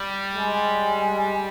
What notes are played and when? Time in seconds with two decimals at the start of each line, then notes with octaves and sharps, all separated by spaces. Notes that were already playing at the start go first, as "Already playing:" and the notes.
Already playing: G3
0.34 G#3